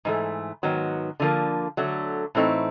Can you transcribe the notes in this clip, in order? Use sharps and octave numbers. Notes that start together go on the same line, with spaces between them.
G#2 E3 A3
G#2 D#3 F#3 B3
D3 F3 A#3
D3 F#3 A3
A2 E3 A3 C4 D#4